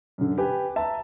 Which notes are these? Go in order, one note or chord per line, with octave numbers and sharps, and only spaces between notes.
F#2 D3
G4 B4 G#5
E5 A5 A#5